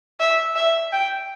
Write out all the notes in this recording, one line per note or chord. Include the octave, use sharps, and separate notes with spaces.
E5
E5
G5